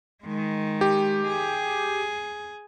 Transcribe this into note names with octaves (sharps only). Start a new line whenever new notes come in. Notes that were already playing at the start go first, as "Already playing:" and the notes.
D#3 G#3
G4
G#4